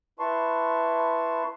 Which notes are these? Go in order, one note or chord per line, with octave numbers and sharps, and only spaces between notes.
E4 B4 A5 C6 C#6